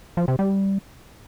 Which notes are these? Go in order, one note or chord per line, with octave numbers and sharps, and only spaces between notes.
F3
C3
G3